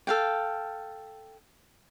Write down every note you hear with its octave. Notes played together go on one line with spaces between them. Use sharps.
A4 F5 G5